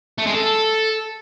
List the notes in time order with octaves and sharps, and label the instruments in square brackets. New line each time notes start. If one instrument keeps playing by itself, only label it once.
[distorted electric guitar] A3
G#3
A4